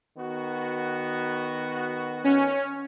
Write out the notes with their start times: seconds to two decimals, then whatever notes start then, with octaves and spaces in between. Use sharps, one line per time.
0.17 D#3 B3 F#4
2.24 C#4